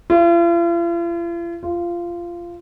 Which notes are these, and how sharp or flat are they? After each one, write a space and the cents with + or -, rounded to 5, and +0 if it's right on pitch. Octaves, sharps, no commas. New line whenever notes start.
F4 -45
F4 -15